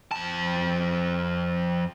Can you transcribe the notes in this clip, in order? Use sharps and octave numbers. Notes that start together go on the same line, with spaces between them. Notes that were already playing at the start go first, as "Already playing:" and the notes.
F2 A5